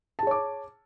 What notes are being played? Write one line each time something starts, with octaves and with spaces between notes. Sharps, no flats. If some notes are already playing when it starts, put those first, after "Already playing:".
G#4 C#5 A5 D6